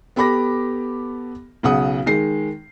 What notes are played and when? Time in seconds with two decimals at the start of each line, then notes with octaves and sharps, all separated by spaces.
0.16 B3 G4 A4 B5 D6 A#6
1.63 B1 C#3 F#5 D#6
2.06 D#3 G#3 C7